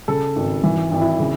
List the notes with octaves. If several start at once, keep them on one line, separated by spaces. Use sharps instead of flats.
C#3 A4
G#1
E3
G#1
E4
C#3